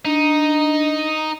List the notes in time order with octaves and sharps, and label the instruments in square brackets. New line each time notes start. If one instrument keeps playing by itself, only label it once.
[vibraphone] D4 [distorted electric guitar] D#4